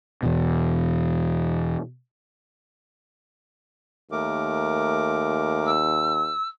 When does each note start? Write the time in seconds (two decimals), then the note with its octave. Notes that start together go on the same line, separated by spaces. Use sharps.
0.23 E2 B2
4.12 D#2 A3 A#4 D6
5.66 E6